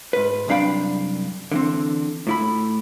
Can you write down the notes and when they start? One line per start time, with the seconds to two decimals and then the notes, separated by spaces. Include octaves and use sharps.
0.13 G#2 B4
0.48 C2 F#2 D4 F5 G5 B5
1.52 D3 E3 C4
2.27 A2 E4 B5